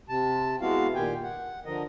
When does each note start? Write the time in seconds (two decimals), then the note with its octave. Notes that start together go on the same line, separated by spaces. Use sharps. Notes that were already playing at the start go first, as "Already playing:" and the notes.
0.09 C3 A5
0.61 G#3 B3 E4 F#4 F5
0.95 A#2 D#3 G4 G5 G#5
1.23 F#5
1.66 D3 F3 A#4 D#5